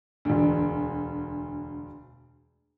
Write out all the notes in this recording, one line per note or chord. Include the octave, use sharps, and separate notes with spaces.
E1 D2